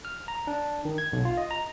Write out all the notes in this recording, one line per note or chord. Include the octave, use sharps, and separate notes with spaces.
F6
A#5
D4
D#3
G#6
B1
F4
D#5
A#5